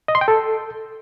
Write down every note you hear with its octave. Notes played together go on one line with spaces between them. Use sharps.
D#5
C6
G5
A4